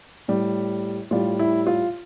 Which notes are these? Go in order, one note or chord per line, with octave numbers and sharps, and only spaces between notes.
A2 G3
A2 G3 F4
E4
F4